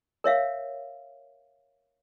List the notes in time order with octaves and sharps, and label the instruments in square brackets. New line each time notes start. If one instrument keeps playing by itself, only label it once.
[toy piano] A#4 C#5 E5 F5